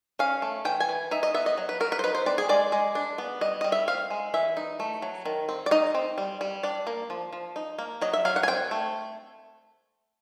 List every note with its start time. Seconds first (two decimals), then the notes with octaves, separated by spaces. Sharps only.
0.19 C#4 F5
0.42 A3
0.65 E3 G5
0.80 G#5
0.89 E3
1.11 D#4 E5
1.23 D#5
1.34 B3 E5
1.46 D#5
1.58 F#3
1.69 B4
1.80 F#3 A#4
1.92 B4
1.99 C5
2.03 D#4 B4
2.15 C5
2.26 C4 D5
2.38 G#4
2.49 G#3 D5
2.72 G#3
2.95 D4
3.18 B3
3.41 G3 D#5
3.61 G3 D#5
3.72 E5
3.88 C4 F5
4.10 G#3
4.34 E3 E5
4.57 D#4
4.80 A3
5.02 F#3
5.25 D#3
5.49 C4
5.66 D5
5.71 D#4 D#5
5.94 C4
6.18 G3
6.41 G3
6.63 D4 D5
6.87 A#3
7.10 F3
7.33 F3
7.56 D#4
7.78 A#3
8.01 F#3 D#5
8.13 E5
8.25 F#3 F5
8.36 F#5
8.43 G#5
8.48 C4 G5
8.71 A3